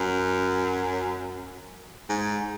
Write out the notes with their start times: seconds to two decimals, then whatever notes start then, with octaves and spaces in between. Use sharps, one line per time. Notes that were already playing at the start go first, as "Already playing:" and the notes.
Already playing: F#2
2.09 G#2